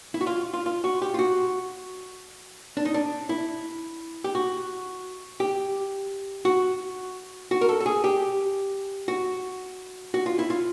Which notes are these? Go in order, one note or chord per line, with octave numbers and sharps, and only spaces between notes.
E4
F#4
F4
F4
F4
F#4
G4
F4
F#4
D4
D#4
D4
E4
G4
F#4
G4
F#4
F#4
A#4
A4
A4
G#4
G4
F#4
F#4
F4
E4
F4